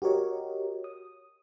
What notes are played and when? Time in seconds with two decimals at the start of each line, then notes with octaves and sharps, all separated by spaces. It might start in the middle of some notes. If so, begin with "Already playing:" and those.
0.02 F#4 G4 A#4 C#5 D#5
0.84 D#6